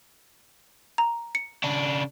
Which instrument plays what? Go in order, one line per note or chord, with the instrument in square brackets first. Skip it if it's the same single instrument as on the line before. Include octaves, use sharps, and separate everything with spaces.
[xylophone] A#5
C#7
[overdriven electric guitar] C#3 D4